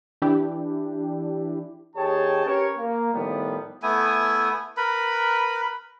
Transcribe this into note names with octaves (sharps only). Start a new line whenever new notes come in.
E3 D4 E4 G4
D#2 G4 G#4 C#5 G5 A5
C#4 G4 A#4 B4 C#5
A#3
A2 D#3 F3 G3 B3
A3 B3 E4 G#5
A#4 B4 B5